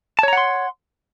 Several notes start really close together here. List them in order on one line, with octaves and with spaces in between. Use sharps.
A5 C#5 A#5 F#5 C6